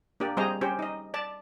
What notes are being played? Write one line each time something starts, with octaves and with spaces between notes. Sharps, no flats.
A#3 D4 G4 D5
G3 C4 G#4 C5 D#5 A#5
C#4 G4 C5
D#4 D#5
D5 A5